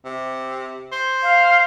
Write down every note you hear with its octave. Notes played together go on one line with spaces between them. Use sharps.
C3
C5
F5